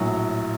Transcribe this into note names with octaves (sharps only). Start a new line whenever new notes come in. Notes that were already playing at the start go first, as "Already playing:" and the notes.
Already playing: A#1 A2 F#3